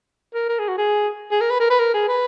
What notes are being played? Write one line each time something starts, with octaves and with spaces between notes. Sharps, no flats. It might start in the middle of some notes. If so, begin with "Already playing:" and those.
A#4
A#4
G#4
F#4
G#4
G#4
A#4
B4
A#4
B4
A#4
G#4
B4